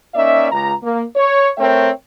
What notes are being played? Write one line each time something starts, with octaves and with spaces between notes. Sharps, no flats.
A#3 C#4 D#4 D5 E5
C#2 A#5
A#3
C#5
A3 C4 A#4 C#5 E5 G5